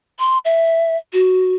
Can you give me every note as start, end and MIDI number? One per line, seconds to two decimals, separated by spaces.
0.19 0.38 84
0.45 0.97 76
1.13 1.55 66